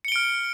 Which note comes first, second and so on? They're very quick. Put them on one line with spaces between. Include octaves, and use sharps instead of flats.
C#7 G7 D7 F6